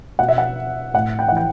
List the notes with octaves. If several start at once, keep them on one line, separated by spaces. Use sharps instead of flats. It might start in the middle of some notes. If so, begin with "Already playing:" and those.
B2 F#5
E5
F#5
A2 F#5
G5
F#5
E3 G5